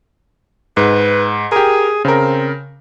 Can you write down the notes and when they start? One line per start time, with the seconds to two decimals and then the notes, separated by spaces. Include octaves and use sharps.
0.77 G#2 B4
1.52 G4 G#4 A#4
2.05 C#3 C4 A#4